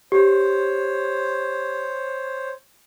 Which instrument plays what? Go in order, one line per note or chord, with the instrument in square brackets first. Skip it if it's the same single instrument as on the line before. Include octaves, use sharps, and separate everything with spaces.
[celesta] G4 [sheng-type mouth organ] C5 C#5